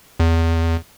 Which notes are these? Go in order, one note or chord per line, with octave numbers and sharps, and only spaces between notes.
E2